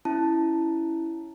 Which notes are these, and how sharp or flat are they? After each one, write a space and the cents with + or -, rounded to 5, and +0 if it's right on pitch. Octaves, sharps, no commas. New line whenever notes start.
C#4 +0 E4 +0 A5 +0